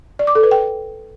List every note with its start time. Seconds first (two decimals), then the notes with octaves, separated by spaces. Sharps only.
0.19 D5
0.27 D6
0.35 A4
0.43 B4
0.51 G5